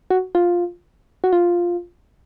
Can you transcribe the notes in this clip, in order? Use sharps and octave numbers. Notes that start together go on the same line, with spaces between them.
F#4
F4
F#4
F4